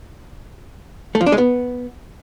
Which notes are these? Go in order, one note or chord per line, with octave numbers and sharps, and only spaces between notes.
A3
F3
D4
G#3
B3